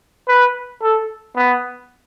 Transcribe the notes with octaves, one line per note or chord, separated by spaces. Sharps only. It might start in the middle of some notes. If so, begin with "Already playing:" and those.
B4
A4
B3